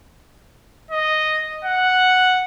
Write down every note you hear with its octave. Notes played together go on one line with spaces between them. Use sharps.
D#5
F#5